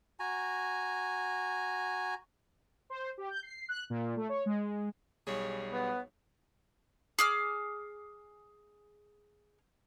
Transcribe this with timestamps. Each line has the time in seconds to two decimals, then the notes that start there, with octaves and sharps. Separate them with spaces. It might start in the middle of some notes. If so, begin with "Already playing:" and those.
0.20 F#4 G#5 A#5
2.90 C5
3.18 G4
3.30 G6
3.43 C7
3.69 F#6
3.90 A#2
4.16 A3
4.29 C#5
4.46 G#3
5.27 B1 G3 C#4 G#4
5.73 B3
7.19 G#4 D6 F6